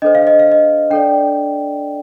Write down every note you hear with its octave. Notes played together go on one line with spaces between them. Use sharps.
D4 A4 C5 D#5
F5
D#5
F5
D#5
D4 A4 D5 G5